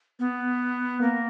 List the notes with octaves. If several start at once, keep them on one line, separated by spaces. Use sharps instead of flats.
B3
A#3